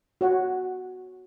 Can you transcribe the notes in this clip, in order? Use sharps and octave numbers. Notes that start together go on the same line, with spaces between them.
F#4 C#5 F#5